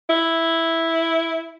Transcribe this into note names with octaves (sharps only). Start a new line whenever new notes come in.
E4